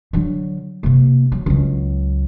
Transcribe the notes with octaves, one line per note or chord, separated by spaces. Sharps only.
D3 F#3
C3 A#3
F#3
C#2 F#3